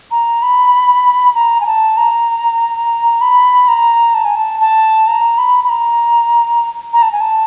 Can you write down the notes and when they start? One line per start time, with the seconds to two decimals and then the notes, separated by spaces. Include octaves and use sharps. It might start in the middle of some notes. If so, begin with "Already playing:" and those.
0.11 A#5
0.42 B5
1.35 A#5
1.61 G#5
1.66 A5
1.97 A#5
3.21 B5
3.68 A#5
4.14 A5
4.25 G#5
4.36 A5
4.61 A5
5.07 A#5
5.38 B5
5.64 B5
5.69 A#5
6.93 A#5
7.03 A5
7.12 G#5
7.21 A5